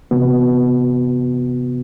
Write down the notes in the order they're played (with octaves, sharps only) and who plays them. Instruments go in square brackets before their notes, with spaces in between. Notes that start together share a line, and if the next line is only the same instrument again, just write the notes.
[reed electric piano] C3 E3 B3 F#4